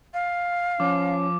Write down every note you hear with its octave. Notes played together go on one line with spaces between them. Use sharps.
F5
F3 C#4 D6